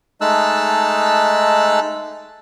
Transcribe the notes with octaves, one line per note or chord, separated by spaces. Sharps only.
G#3 A3 D#4 A5 E6 F#6